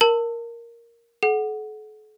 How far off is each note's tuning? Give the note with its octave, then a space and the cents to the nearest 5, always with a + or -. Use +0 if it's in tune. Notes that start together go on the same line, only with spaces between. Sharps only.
A#4 +0 A5 +35
A4 -45 F#5 +0